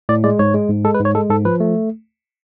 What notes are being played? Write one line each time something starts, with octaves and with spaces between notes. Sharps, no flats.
A2 D5
G#3 D5
G#2 C#5
G#3
G#2
G#3 A4
B4
G#2
C#5
G#3 A4
G#2 A4
F3 B4
A3